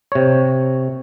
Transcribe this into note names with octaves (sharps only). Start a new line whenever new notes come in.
C3 C#5